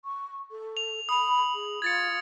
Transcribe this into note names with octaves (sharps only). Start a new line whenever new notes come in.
C#6
A4
F7
B5 D#6 F7
G#4
F4 G#6 A6 C#7